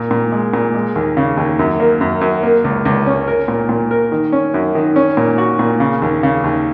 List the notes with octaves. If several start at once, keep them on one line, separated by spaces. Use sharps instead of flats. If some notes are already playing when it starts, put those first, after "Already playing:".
Already playing: A#2
A#2
G#3
A#2
G#3
D#2
C#3
D#2
F#2
A#3
F#2
F#2
A#3
C#2
C#2
C#4
A#4
A#2
A#2
A#4
D#3
C#4
F#2
D#3
C#4
A#2
F#4
A#2
C#3
D#2
C#3
D#2